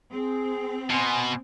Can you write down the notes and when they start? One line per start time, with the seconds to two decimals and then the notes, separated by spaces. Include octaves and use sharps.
0.11 C4 G#4
0.90 B2 G#5 C6